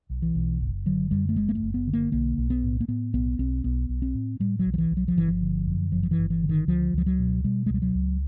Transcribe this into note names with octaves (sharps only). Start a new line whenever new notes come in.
B1
E3
B1
F#1
D3 F#3
F#2 G3
A3
F#1 G#3
A#3
A3
F#1
B3
D3
A#3
B1 A#3
B1
B3
A2
A#3
A2 B3
B1 B3
B1 C4
B1 B3
B1
C4
A2
A2 G3
F#3
B1
F3
E3
B1
F#3
F3
G1 E3
F3
D3
F#2
G1 F3
F3
E3
G1
E3
D3
D#3
C#2 F3
C#2 F3
F#3
B2
B2 G3
G#3
C#2 G3
F#3
C#2